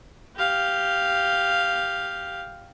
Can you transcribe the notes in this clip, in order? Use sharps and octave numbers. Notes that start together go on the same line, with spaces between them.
G4 F5